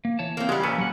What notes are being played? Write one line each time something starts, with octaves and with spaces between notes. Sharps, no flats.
A#3
E3 C#5 A5
A#3 C4
G3 G#3 G4 F#5
A#2 C#4 A4 B4
F#3 F#5